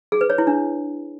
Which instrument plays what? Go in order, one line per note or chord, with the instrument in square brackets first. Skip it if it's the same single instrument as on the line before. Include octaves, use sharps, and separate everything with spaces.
[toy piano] G#4
B4
C#5
E4
D4